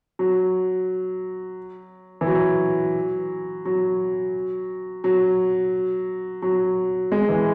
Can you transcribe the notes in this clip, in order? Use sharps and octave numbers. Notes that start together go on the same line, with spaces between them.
F#3
E3
F#3
F#3
F#3
F#3
G#3
E3